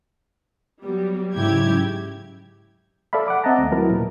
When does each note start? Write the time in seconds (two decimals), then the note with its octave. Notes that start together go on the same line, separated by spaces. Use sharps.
0.82 F#3 G3 B3
1.34 G#2 C#3 F#3 E4 G4 G#6
3.13 A4 D5 E5 F5 B5
3.28 F#5 D6
3.44 C4 D#5 E5 F#5 A5 A#5
3.58 D#2 A3
3.72 F#3 E4 A#4 B4
3.91 A#2